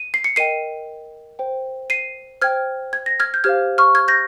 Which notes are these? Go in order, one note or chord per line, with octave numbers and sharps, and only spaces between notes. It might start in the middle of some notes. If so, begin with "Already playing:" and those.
Already playing: D#7
C7
C#7
A#4 D#5 G5 C7 D#7
C5 G5
C7 D#7
C5 G5 F6 G#6
G#6
A#6
F6 G#6
G6
G4 C5 F5 F6 G#6
C#6 F6
F6 G#6
G6 A#6